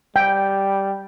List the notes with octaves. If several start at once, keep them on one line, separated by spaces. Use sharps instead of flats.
G3 G5